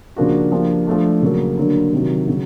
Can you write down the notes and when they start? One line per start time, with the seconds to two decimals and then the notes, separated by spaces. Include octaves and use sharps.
0.16 C#3 F3 A#3 D4 F#4
0.52 F3 A#3 D4 G4
0.87 F3 A3 D4
1.22 C#3 F#3 A#3
1.58 D3 F#3 A#3
1.93 C3 D#3 F#3
2.28 C#3 F#3